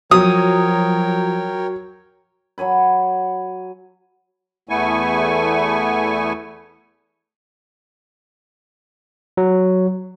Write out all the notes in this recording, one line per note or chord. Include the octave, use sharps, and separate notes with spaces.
F3 F#3 A#4 C#5 G5 D#6
F#3 C#5 G#5 B5
E2 A3 B3 E4 G#5 C#6
F#3